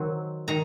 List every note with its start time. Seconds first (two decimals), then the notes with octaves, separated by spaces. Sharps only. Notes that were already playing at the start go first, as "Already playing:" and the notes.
Already playing: D#3 F#3 C4
0.48 D#3 A#5